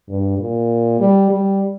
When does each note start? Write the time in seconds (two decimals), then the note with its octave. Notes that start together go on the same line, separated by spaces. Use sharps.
0.09 G2
0.38 A#2
1.00 G3
1.31 G3